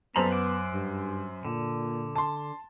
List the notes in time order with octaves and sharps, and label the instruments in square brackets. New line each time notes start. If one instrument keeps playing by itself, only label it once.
[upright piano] F#2 C5 F#7 [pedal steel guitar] G3 A4 A#5 [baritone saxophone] B3
[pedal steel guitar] F#5 D6
[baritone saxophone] G2
[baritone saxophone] A#2 [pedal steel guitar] D3
[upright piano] A5 C6